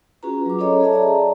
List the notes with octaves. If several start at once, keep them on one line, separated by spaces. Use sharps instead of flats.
C#4 F4 F#4 G#4 B4 A#5
F#3 D6
C#4 G#4 A4 C#5 D#5 A#5
G#4 A4 C#5 E5 A5
D5 A#5